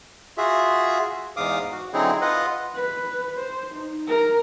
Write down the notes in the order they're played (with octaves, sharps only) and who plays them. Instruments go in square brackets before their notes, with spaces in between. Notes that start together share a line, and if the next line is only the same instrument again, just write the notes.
[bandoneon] F4 F#4 G#4 E5
E2 G#2 F5 D6 D#6
F#4
D3 F#3 C4 D#4 E4 G#4
F4 B4 D#5 F#5
[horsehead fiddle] B4
C5
D#4
A#4